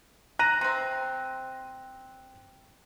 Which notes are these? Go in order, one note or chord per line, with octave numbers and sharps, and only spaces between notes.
A#5 F#6 A#6 D#7
C3 C4